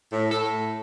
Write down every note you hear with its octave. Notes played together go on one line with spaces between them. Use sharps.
A2
A2 A4